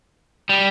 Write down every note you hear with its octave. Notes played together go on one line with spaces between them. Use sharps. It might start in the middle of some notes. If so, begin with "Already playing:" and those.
G3